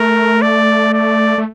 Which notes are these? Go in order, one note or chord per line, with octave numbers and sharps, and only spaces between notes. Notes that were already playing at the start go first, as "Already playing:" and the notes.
Already playing: A3 A#4
D5
D5
A3